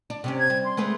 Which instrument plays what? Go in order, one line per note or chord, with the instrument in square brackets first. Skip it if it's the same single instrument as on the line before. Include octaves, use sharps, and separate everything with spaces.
[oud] D4
C3 C4 C#4
[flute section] G#6
[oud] G3
[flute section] C6
[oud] G#3 A3 B4